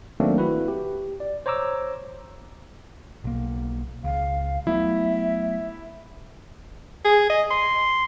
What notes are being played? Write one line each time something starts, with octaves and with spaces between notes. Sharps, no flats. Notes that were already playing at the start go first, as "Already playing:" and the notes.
D#3 F#3 A3 A#3 C4 D4
E4 F#4 B4
G4
D5
C5 C#5 A#5 D6 E6
B1 A#3
C#2 F5
F#3 A3 B3 E4 E5
G#4
D#5
C6